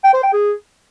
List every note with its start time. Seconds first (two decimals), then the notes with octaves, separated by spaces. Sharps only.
0.04 G5
0.14 C5
0.23 G5
0.33 G#4